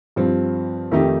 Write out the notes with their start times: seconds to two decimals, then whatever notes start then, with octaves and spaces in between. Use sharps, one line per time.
0.16 G2 F3 C4
0.91 F2 D#3 A3 D#4 G4